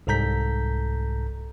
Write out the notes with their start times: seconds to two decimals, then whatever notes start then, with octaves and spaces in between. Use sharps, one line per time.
0.07 C2 G#2 A4 A#5 G6 B6